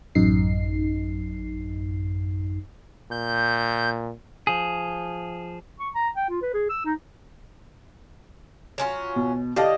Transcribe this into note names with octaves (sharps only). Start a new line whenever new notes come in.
A1 F#2 D#4 C7
A#2 G6
F3 G#4
C#6
A#5
G5
F4
B4
G#4
E6
D#4
F#3 C#4 F4
B2
D3 G4 D#5 F5 A5